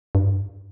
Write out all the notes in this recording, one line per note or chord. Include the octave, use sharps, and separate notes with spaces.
G2